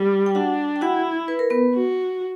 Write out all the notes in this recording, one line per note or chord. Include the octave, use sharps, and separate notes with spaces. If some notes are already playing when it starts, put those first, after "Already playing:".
Already playing: G3
G5
D4 F#4 F#5
G5
E4 F#4 F#5
B4
A#4
B3 B4
F#4